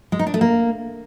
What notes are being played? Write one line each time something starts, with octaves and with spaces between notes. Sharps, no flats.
G#3
D#4
D4
A3
A#3